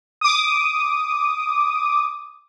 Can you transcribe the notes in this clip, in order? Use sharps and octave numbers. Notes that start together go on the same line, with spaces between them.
D6 D#6